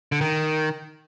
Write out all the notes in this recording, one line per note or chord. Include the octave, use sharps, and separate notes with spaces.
D3
D#3